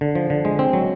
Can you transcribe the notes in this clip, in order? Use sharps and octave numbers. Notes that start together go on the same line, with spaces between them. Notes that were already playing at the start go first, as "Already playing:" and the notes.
D3
F3
D3
G#3
C4
F#3